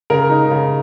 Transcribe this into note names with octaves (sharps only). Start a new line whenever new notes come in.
C#3 A#4
D#4
C#3